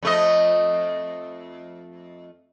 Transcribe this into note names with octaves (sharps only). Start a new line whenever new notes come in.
F2 A3 D#5